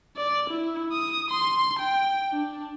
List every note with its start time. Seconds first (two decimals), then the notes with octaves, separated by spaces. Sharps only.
0.17 D5
0.50 E4
0.92 D#6
1.30 C6
1.79 G5
2.31 D4